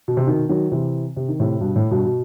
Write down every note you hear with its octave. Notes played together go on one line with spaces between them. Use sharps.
B2
C3
B2 D#3
D#3 F#3
C3 E3
C3
D#3
A2 C3
G2 B2
A2
G2 B2
B2